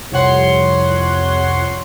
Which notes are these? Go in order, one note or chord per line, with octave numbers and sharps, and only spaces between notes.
C2 F2 C#5 F#5 C6